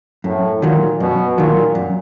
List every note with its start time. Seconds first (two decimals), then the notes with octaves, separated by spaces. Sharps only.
0.24 F#2 A2
0.62 A#2 D#3 F#3
1.00 F#2 B2
1.38 A#2 D#3 F#3
1.75 F#2